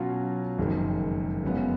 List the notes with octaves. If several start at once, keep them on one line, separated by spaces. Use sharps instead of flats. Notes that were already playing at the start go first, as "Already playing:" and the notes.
Already playing: B2 F#3 C#4 F4
F#1 F2 D#3 G#3
F#1 F#2 C#3 G#3 B3